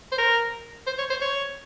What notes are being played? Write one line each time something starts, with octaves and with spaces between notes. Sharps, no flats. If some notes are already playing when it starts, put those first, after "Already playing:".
C5
A#4
C5
C#5
C5
C#5